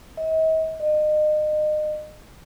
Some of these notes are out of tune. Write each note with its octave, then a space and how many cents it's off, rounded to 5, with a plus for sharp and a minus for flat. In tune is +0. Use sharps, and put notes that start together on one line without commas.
D#5 +45
D#5 -35